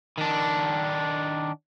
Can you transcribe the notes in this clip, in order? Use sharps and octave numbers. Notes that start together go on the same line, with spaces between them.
D#3 D4